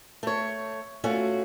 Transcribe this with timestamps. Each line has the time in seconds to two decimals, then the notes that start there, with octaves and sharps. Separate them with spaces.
0.23 A3 C#5
1.04 A3 C#4 F4 F#4